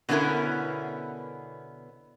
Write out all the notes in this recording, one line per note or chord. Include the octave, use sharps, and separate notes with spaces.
B2 D3 B3 C#4 E4 A#4